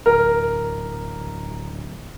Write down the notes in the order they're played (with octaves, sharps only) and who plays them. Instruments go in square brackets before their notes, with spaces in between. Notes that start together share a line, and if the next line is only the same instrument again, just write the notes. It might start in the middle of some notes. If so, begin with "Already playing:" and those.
[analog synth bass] D1 [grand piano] A#4